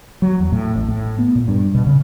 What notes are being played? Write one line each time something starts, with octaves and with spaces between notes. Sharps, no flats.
F#3
E2
A2
A1
A2
B3
A#2
G2
B2
C#3